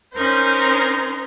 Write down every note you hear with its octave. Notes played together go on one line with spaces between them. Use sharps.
C#4 D#4 A#4 C5